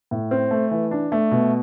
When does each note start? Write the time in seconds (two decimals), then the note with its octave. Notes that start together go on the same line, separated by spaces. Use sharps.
0.11 A2
0.31 C4
0.51 A3
0.71 E3
0.91 D4
1.12 A3
1.31 B2